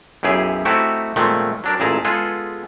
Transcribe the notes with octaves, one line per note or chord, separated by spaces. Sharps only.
B1 F#2 E4 G4 G#4
A3 C4 D#4 E4 F#4 G4
A#2 D#3 F3 G#3 A3 C4
F#3 D4 A#4
A1 A#2 E4 G#4 A5 A#5
G#3 B3 F4 G#4 A4